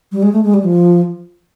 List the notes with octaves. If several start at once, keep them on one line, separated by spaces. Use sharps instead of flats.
G3
G#3
A3
G#3
G3
F3